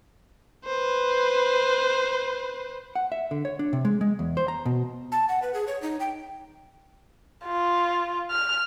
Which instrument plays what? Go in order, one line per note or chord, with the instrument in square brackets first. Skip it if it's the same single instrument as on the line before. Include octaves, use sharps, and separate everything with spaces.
[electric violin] B4 C5
[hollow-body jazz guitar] F#5
E5
D3
C#5
D4
C3
G#3
G#3
E2
C5
A#5
B2
[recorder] A5
F#5
B4
G#4
C#5
D#4
G5
[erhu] F4
F6